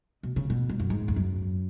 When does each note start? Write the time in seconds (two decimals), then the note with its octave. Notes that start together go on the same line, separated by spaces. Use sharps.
0.23 B2
0.36 C#3
0.50 B2
0.69 G#2
0.80 F#2
0.90 G#2
1.08 E2
1.16 F#2